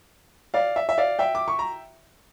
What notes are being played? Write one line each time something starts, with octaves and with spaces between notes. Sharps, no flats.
D5 F5
E5
E5
D5 F5
E5 G5
D6
C#6
A#5